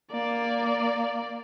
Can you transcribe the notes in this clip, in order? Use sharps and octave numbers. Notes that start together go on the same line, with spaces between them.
A#3 D5